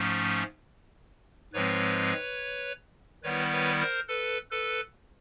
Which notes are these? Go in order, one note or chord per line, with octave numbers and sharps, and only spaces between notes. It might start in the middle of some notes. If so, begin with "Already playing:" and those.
Already playing: G#2 F3 A3 C#4
G#2 F3 G#3 C4 B4 C#5
D#3 G3 B3 E4 B4 C#5
B4 C#5
A#4 C5
A4 B4
A4 B4